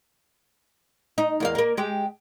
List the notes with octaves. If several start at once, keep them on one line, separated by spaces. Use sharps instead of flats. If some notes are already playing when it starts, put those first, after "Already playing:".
D#4
E2 A#3 F5
A#3 A#4
G#3 G4